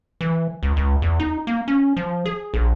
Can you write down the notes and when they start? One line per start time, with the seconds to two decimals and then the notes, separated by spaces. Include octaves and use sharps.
0.21 E3
0.63 C#2
0.76 C#2
1.02 E2
1.20 D#4
1.47 A#3
1.68 C#4
1.97 F3
2.26 G#4
2.54 A#1